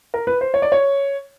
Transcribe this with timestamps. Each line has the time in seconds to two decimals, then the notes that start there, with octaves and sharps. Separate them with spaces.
0.14 A#4
0.27 B4
0.41 C5
0.54 C#5
0.62 D5
0.72 C#5